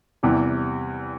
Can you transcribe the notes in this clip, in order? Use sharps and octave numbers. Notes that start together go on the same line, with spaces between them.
E2 C3 E3 G3